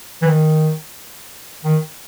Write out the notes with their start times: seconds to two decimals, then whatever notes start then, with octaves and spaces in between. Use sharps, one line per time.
0.22 E3
0.27 D#3
1.65 D#3